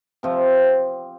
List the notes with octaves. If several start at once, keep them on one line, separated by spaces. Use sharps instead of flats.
C3 F3 C4